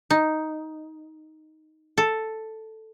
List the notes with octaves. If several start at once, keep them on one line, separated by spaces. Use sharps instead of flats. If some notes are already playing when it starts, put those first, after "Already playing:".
D#4
A4